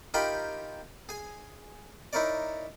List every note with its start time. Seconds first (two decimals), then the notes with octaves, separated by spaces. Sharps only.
0.14 D#4 F4 G4 A#4 G5 B5
1.09 G#4 G#5
2.13 D#4 E4 A#4 C#5 D5